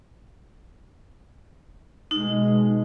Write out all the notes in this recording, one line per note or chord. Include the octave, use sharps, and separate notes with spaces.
B2 G#3 D#4